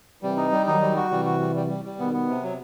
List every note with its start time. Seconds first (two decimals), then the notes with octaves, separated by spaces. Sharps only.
0.23 C3 E3 G3
0.37 D#4
0.52 G3
0.67 D#3 F#3 D#4
0.82 G3
0.96 F#4
1.11 C3 E3 G3
1.25 F#4
1.40 G3
1.55 G3
1.70 G3
1.85 G3
1.99 B2 D#3 B3
2.13 B3
2.28 C3
2.43 F#3